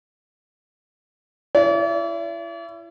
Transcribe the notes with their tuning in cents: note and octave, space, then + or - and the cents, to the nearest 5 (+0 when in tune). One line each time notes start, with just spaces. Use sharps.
E4 +30 D5 -45